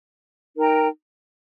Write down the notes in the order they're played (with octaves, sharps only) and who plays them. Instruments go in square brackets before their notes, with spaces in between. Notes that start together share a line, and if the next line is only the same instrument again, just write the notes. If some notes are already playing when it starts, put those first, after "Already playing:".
[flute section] D#4 A#4 G5 A#5